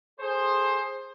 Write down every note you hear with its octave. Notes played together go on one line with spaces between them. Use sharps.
G#4 A4 C5